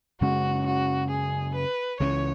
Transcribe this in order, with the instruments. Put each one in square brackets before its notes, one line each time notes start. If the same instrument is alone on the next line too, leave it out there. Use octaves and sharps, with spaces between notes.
[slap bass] F#2 C#3 G#3 C#4 [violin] F#4
[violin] F#4
G#4
B4
[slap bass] C#2 C#3 E3 C#4 [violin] C#5